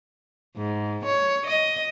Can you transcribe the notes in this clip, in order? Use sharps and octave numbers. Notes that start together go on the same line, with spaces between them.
G#2
C#5
D#5